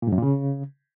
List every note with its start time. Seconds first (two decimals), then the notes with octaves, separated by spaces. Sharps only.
0.02 A#2
0.07 G#2
0.12 F#2
0.17 A#2
0.22 C#3